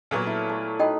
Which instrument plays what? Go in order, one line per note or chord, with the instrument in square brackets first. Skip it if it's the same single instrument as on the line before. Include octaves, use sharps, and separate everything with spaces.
[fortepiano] A#2 F#3 B3 [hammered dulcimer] A4 A#4 C#5
[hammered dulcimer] E4
A3
[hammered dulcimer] D#4 B4 [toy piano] F#4 D#5 G5